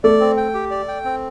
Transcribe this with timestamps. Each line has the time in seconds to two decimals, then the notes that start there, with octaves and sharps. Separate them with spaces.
0.04 A3 D5
0.20 C4
0.37 G5
0.54 G4
0.71 D5
0.88 G5
1.05 C4